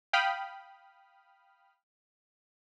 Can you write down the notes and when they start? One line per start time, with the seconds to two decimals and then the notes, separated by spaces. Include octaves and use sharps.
0.13 F5 G5 B5 D#6 F6